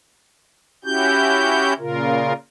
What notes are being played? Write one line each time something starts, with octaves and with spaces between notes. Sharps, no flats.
C#4 E4 F#4 G4 G6
A#2 C#3 F4 A#4